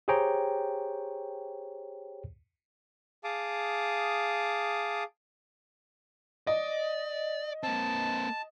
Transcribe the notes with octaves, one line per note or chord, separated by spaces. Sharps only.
G4 G#4 C5 C#5 G5 A#5
G#4 F5 A5 D6 D#6
D5 D#5
A#3 C4 A5